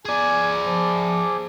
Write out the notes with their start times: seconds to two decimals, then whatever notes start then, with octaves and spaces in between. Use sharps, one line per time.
0.05 G#4 D5 G#5
0.65 F3